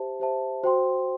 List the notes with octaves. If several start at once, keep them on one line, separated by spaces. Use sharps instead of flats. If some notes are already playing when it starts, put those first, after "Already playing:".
Already playing: G4 C5 E5 A5
G4 C5 E5 A5
F#4 C5 G5 C6